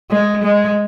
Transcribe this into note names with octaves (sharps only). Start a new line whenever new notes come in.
G#3
G#3